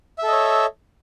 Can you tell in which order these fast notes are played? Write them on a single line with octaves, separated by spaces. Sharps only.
E5 A4 D#5 C#5